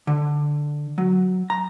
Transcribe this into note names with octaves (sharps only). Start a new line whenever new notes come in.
D3
F#3
A#5